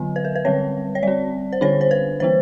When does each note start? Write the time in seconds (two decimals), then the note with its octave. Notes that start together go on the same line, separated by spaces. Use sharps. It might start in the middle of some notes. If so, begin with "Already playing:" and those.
Already playing: D3 F#3 B3
0.16 B4
0.25 A#4
0.35 B4
0.45 D3 G3 C4 C#5
0.95 C#5
1.03 G3 C4 D5
1.53 C5
1.61 D3 G3 B3 D4 C#5
1.81 C5
1.91 B4
2.20 E3 G3 A#3 C5